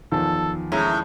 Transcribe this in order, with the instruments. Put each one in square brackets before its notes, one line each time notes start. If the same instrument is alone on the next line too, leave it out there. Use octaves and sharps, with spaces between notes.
[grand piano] E2 D#3 F3 [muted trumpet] A4
[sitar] A2 [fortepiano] G#3 C#4 E4 [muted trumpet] A#5